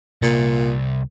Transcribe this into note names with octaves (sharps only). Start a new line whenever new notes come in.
C2 A#2